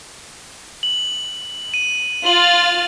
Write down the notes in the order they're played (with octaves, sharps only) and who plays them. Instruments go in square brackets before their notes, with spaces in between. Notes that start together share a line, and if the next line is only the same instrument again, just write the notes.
[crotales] F#7
D#7
[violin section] F4 F6 A6 [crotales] F#7